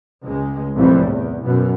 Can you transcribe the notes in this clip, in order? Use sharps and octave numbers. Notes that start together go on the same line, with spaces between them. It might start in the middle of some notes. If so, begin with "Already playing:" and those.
C#2 G#3
C2 F2 A2 E3 G3
E2
F#2 B2